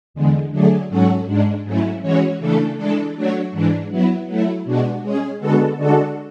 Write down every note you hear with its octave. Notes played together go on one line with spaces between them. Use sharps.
E2 D3 G#3
D3 F#3 A3 D4 G#4
G#2 F#3 C#4 F#4 A4
G#2 G#3 D4
G#2 F#3 A3 C#4 E4
E3 G#3 C#4 F#4 C#5
C#3 E3 A3 D4 A4
E3 G#3 D4 A4
F#3 A3 D4 F#4 C#5
G#2 E3 G#3 D4
F#3 B3 E4
F#3 A3 E4
B2 G#3 D4 F#4
G#3 C#4 G#4
D3 G#3 B3 F#4 A4
D3 G#3 D4 F#4 A4